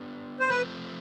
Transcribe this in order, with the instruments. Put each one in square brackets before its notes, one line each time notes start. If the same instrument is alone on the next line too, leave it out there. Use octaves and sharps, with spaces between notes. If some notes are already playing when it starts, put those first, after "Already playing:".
Already playing: [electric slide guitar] B3 D4 G4
[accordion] C5
[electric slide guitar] F3 A3 C4 [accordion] B4